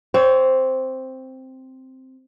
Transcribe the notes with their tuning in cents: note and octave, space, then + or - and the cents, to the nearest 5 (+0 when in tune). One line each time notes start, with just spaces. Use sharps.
C4 +0 C#5 +30